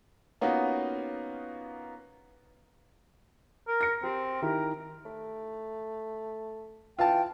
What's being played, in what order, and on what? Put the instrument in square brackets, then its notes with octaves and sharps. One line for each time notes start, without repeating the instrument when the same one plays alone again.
[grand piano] A#3 B3 C#4 D#4 F4 F#4
[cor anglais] A#4
[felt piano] A#6 C#7
[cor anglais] C4 [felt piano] G4
[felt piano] D#3 E4 G4 [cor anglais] A#4
[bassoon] A3
[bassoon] E3 [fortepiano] F4 A5 [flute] G5